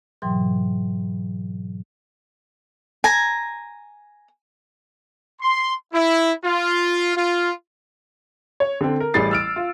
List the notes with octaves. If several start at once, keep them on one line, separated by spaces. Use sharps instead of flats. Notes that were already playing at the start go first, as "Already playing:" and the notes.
G#2 B2 E3 F#3 G5 C6
G#5 A#5
C6
E4
F4
F4
C#5
D3 C4
A#4
A1 E3 G3 G#4 A6 C7
E6 F6 D7
F4